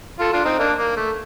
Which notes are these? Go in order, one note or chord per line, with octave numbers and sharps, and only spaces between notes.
F4 A4
D4 F4
C4 D#4
A#3 D4
A#3
A3